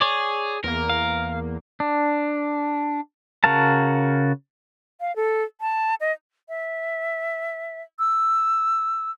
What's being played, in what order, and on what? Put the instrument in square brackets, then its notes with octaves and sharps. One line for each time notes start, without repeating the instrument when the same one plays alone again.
[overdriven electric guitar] G#4 [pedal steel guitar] C#5 D5
[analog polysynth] E2 A#3 [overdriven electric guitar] A#4
[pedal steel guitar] F5
D4
C#3 F#4 A#4 F5 A5
[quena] F5
A4
A5
D#5
[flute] E5
E6